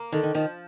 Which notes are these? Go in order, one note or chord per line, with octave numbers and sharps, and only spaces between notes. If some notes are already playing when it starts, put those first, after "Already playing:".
Already playing: A#3
D3 D#3
D#3
D#3 F3